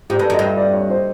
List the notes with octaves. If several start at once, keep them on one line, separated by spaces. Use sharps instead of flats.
G#2 G4
G2 A4
F#2
D#5
G2
E5
D5
C#5
C5